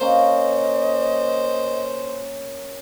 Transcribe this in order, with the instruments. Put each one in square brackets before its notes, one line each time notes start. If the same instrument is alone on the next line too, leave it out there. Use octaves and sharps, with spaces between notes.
[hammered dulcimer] A#3 C#4 [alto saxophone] C5 [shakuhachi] D#5